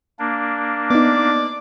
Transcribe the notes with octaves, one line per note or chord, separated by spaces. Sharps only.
A#3 D4
B3 D#4 D5